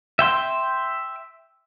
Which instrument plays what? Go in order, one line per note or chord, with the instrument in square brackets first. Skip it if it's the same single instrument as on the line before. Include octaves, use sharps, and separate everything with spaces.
[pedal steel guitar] E5 G5 C6